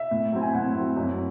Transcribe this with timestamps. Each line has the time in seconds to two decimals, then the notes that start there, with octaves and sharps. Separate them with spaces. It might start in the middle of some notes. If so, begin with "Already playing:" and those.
Already playing: E5
0.11 A2
0.33 F#3 C4 E4
0.42 G#5
0.53 A2 F#5
0.75 F#3 C4 E4
0.96 F#2